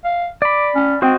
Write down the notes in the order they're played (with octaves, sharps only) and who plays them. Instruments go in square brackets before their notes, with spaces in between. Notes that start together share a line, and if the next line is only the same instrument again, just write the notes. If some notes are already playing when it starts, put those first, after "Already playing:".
[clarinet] F5
[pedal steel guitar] D5 B5 [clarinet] D6
[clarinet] C#4
[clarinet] C4 [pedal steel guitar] F#4 C5 D#5